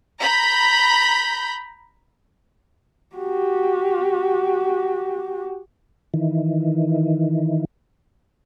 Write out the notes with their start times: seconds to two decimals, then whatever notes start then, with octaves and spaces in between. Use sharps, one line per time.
0.20 A#5 B5 G6
3.16 F#4 G4
6.14 D#3 E3